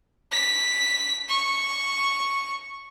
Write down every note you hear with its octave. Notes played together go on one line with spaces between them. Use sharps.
B6
C#6